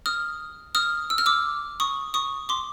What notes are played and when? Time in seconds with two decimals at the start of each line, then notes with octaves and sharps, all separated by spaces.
0.06 D#6 F6
0.75 D#6 F6
1.10 E6
1.18 F6
1.26 D6 E6
1.80 C#6 D#6
2.14 C#6 D#6
2.49 C6 D6